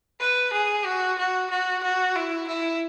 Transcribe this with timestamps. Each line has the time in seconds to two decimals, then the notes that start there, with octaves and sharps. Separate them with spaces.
0.20 B4
0.53 G#4
0.86 F#4
1.19 F#4
1.51 F#4
1.83 F#4
2.16 E4
2.48 E4